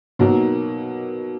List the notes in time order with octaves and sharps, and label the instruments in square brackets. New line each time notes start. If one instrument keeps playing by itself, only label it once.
[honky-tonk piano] B2 F#3 A#3 D#4 A#4